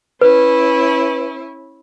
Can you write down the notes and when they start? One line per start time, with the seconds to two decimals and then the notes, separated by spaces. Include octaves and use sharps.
0.21 C#4 E4 B4